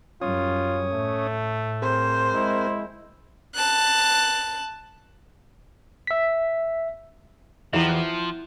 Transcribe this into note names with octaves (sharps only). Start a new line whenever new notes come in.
F#2 G3 C#4 F4 C#5 D#6
A2 A3
C4 G#4 A#4 C5
G#3 E4
A5 F#6
E5 B6
E2 E3 F3 E4 G4 E5
F#6 G6 D#7